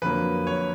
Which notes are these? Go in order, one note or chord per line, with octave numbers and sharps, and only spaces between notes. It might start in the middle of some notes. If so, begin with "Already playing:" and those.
F2 D3 F#3 A#3 B4
C#5